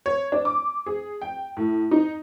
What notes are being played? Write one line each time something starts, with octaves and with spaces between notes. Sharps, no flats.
C#5
D4
D6
G#4
G5
A2
D#4